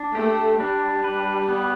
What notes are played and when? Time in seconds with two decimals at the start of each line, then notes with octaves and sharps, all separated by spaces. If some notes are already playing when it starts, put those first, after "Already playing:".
Already playing: D4
0.15 A3 G4
0.60 G3 D4
1.04 B4
1.49 B3